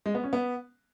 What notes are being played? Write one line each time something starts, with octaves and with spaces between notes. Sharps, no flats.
G#3
B3
C#4
B3